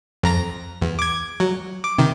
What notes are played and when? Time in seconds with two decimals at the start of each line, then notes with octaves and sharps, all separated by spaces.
0.23 F2 A#5 A#6
0.82 E2
0.99 D6 G#6
1.40 F#3
1.84 D6
1.99 C3 D#3